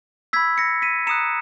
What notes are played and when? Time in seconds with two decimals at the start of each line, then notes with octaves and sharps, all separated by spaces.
0.33 B5 E6 G#6 B6
0.58 A#6 C#7
0.82 B6 D#7
1.07 A#5 D#6 F#6 C#7 E7